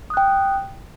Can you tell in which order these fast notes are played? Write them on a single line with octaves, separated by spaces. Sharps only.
D#6 F#6 G5